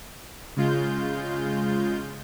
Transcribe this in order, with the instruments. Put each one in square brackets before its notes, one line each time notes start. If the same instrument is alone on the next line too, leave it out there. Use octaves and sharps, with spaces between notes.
[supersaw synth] C#3 G#3 F4 G6